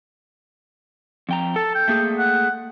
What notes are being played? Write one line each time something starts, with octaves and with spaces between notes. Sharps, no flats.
F2 G5 A#5
A4 A5
G5
A3 A#3 G#4
F#5